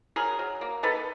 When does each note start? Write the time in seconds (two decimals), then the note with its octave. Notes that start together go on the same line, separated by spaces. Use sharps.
0.16 F#3 G#4 A#4
0.39 F#3
0.61 A#3
0.83 D#3 A4 B4